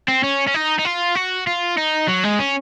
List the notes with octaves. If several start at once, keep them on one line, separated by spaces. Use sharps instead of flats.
C4
C#4
C#4
D#4
D#4
F4
F#4
F4
D#4
F#3
G#3
C#4